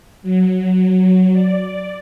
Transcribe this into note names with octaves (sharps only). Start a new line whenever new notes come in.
F#3
D5